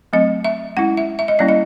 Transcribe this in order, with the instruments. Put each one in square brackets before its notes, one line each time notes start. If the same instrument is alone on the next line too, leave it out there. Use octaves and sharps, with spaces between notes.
[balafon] F#3 A3 C4 D#5
E5
G#3 C#4 E4 F#5
E5
E5
D#5
G3 A#3 C#4 E4 D5
D#5